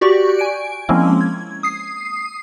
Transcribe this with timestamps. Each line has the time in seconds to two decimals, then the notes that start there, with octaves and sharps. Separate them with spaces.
0.01 F#4 G4 D5 C#6
0.39 G#5 D7
0.89 F3 G#3 A#3 C4 C#4 E4
1.21 G#6
1.63 D#6 C7